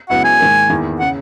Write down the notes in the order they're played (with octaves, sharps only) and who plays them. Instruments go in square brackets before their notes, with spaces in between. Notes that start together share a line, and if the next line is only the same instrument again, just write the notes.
[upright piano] C#2 C#3 F#3 B3 E4 [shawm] F#5
[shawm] G#5
[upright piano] G#2 D#3 A#3
E2 D#3 A#3 E4
[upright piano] C#3 [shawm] F#5